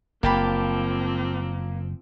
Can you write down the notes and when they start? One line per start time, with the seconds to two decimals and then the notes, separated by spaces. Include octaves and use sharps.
0.23 F#1 F3 A#3 C4 G4 A5 B5